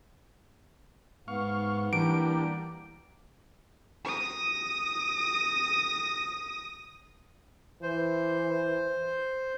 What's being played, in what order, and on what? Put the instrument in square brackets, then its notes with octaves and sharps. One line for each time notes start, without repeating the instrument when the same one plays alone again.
[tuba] G#2 [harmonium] B3 [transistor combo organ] F5 C#6
[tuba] E3 [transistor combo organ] G3 A#3 D4 [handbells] D7
[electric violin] D#6 A#6
[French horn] E3 [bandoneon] C5